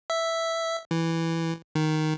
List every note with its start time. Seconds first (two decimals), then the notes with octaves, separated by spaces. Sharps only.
0.10 E5
0.91 E3
1.75 D#3